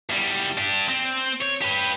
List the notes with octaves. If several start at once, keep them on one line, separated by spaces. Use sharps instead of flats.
E2 G3
D4 G4
C4
C#5
G4 B4